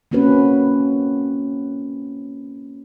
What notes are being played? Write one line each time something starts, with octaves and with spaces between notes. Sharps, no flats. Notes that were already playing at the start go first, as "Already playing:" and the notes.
A#3 C4 C#4 F#4 B4